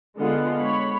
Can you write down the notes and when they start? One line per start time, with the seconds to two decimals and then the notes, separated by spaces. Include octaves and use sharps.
0.16 D3 G#3 B3 F4 F#5
0.58 C#5 B5